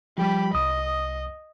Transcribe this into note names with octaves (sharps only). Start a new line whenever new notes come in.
F3 G3 G4 B5
C2 D#5 D#6